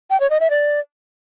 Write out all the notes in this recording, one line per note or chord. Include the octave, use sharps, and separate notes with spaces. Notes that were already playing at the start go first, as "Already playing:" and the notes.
G5
C#5
D#5
E5
D5